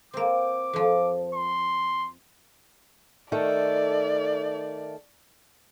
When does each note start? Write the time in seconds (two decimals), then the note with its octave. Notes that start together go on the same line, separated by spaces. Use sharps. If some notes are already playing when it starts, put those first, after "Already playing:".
0.13 A#3 C4 D6
0.73 F2 F3
1.35 C6
3.32 D#3 A3 A4 D5